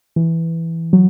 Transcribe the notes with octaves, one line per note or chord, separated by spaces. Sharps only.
E3
F#3